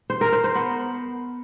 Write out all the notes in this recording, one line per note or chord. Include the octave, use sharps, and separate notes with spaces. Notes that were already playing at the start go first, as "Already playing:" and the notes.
C5
A#4
C5
C5
B3